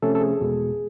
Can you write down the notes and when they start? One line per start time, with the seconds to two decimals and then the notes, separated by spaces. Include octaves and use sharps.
0.02 C3 F3 A3 C#4 A4
0.15 A4
0.21 G#4
0.40 E2 B2 G#3